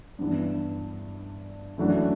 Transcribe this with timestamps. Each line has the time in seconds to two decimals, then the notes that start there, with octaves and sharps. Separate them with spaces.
0.19 G2 E3 B3 D4
1.78 F#2 E3 A3 D4 F#4